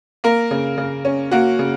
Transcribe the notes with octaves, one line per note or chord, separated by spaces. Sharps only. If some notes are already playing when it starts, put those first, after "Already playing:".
A#3 A#4
C#3
C#3
C#4
A#3 F#4
C#3